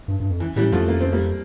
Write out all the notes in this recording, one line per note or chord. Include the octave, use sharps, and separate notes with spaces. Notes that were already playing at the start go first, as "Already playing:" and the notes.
G2
G2
F2
E3
A2 E3 G3
F2 F3 A3
A#3
C4
G3 A#3